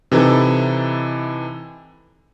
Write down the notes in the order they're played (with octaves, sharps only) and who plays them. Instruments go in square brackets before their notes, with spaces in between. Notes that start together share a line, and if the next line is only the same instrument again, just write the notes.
[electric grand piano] C3 E3 D#4 E4 A4